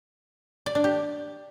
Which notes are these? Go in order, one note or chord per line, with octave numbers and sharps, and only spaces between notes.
D5
D4
G4